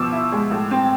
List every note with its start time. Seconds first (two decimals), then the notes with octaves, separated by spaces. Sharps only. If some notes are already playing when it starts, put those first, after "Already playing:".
Already playing: B2 F3 D6 E6
0.12 E4
0.32 G#3
0.51 A2
0.71 C4